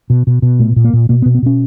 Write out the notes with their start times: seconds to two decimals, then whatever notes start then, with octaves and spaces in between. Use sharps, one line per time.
0.10 B2
0.27 B2
0.42 B2
0.59 A#2 A3
0.76 A#2
0.84 A#3
0.93 A#2
1.09 B2 A#3
1.22 B3
1.26 B2
1.35 B3
1.42 B2 C#4